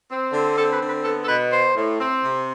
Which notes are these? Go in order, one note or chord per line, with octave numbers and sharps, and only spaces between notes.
C4
D3
C4 A4
B4
D3
B4
B3 A4
A4
B2 B4
B3 C5
A2
C4
C3